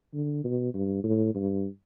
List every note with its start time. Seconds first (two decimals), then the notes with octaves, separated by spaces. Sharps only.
0.14 D3
0.44 B2
0.74 G2
1.04 A2
1.34 G2